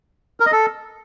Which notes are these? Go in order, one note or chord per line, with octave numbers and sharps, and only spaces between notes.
A#4
D#5
A4